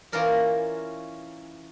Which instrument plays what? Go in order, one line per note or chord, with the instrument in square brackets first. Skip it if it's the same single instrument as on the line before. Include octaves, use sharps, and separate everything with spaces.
[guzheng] E3 A#3 C#4 F4 A#4 D5